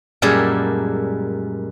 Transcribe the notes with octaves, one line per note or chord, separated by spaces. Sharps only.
F#2 A#2 G3 G#3 G#4 A4